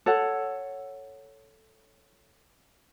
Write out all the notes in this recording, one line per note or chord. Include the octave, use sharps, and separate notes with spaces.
A4 C#5 F#5